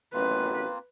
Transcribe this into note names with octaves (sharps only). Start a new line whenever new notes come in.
A1 F#2 B2 A#3 C4 F4 B4